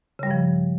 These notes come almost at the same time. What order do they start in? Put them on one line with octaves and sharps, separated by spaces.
C#3 G3 G2 F3